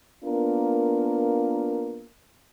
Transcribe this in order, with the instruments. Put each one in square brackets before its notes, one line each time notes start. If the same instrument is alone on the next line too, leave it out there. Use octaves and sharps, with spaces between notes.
[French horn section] A#3 B3 D4 F4 A#4